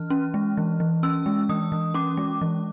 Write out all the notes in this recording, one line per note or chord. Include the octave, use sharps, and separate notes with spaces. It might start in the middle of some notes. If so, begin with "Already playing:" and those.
Already playing: E3 F6
C#4
G#3
E3
E3
C#4 E6
G#3
E3 D#6
E3
C#4 D6
G#3
E3